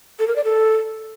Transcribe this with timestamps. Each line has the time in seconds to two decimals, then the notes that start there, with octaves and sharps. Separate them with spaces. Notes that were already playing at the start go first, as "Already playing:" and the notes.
0.19 A4
0.28 A#4
0.36 D5
0.44 A4